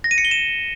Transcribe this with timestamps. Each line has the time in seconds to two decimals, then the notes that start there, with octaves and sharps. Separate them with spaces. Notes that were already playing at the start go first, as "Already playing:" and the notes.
0.04 A#6
0.11 D#7
0.18 C#7
0.25 G7
0.31 E7